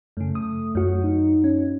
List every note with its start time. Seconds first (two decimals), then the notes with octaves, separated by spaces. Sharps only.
0.17 F#2 C#3 A3
0.35 D#6
0.75 F#2 F#4
1.04 D#4
1.44 C#4